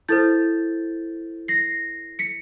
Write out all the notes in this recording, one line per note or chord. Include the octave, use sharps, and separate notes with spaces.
E4 A4 C5 G6 A6
A#6 C7
B6 C#7